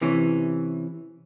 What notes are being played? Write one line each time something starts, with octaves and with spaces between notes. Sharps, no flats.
C3 E3 C#4